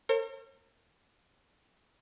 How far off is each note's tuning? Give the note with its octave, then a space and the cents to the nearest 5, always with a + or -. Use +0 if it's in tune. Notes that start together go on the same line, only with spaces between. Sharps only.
A#4 -40 C#5 -40